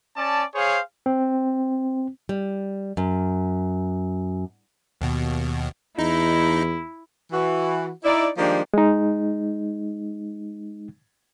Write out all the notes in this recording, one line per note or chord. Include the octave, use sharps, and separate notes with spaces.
C#4 D5 A5
G#4 C5 C#5 F5
C4
G3
F#2
D#2 B2
E2 D#4 E4
E3 F#4
D#4 E4 D5
D#3 F3 G3 G#3 A#3 D4
G#3 D#4